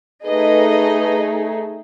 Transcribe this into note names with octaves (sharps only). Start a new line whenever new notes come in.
A3 D#4 G#4 B4 D#5